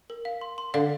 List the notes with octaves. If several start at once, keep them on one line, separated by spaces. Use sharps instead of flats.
A#4
F5
C6
C6
D3 F5